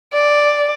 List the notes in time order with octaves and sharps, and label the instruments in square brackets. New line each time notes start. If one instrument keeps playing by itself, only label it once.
[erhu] D5